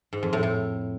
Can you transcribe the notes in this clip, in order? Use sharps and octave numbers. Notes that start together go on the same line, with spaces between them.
G#2
F2
A2
A2